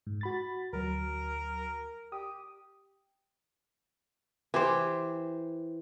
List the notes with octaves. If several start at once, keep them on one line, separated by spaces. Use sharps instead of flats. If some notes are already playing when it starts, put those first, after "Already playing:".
G#2
F#4 B5 A6
D2 F#3 A#4
G4 D#6
E3 G4 C5